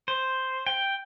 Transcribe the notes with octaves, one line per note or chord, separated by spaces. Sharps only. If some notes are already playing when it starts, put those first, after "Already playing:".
C5
G5